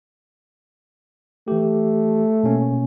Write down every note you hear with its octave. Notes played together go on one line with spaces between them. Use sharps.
E3 A3 G4
B2 A#3 C#4